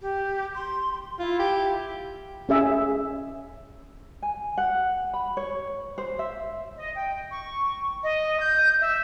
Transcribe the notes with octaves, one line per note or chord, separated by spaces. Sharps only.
G4
C6
E4 F4
G4
C#4 G#4 E5
G#5
F#5
B5
C#5
C5
E5
D#5
G5
C#6
D#5
G6
E5